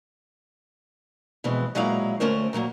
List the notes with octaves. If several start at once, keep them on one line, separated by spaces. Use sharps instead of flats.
F2 B2 E3 G#3
A#2 F#3 G#3 E4 F5 A#5
D2 A3 C#4 A#4 C5
A#2 D3 F#3 A#3